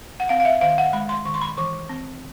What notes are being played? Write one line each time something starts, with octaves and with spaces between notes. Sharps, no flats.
F#5
C4 F5
F5
E5
D#3 F5
F#5
G#3 B5
C6
D#3 C#6
C6
B5
E3 C#6
C4